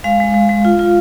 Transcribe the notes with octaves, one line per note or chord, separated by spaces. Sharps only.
G#3 F5
G#3
G#3
G#3
F4
F4